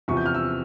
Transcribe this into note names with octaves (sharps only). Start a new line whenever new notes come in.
E2 C3 F3 C#6
G6
F6
E6